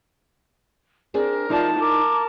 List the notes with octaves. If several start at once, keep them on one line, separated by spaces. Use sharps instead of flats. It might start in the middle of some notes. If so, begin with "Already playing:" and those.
C4 D4 G#4 A#4
F3 D#4 E4 D5 A5
A#4 A5 D6